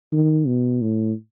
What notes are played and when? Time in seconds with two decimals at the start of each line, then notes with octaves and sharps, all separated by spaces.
0.13 D#3
0.47 B2
0.82 A2